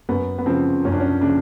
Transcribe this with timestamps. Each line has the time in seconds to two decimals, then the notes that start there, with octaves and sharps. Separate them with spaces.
0.09 F#2 B3
0.39 B3
0.46 C#3 F3 C4
0.85 F#2 C#4
0.92 D4
1.00 C#4
1.21 C#3 F3 D4